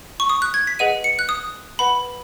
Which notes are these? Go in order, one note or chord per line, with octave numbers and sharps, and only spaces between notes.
C#6
D#6
F#6
G#6
B6
G#4 B4 D#5 F#5 D#7
C#7
F#6
D#6
B4 F#5 B5